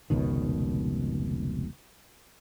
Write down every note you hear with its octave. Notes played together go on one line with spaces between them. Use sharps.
F1 C#2 B2 D#3